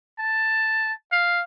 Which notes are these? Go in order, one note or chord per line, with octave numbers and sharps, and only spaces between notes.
A5
F5